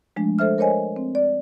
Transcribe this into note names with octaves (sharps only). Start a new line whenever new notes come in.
F3 G#3 A3 D4
A4 C5 E5 F6
A#4 C5 C#5 D#5 G#5
C4
D5